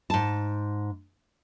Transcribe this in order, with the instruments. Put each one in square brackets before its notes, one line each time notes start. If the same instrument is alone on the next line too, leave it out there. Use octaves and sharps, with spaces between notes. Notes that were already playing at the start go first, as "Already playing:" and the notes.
[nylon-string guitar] G#2 A5